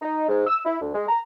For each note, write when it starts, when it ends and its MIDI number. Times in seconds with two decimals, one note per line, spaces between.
0.02 0.27 63
0.29 0.45 44
0.47 0.60 88
0.65 0.80 64
0.82 0.91 38
0.95 1.07 56
1.09 1.20 82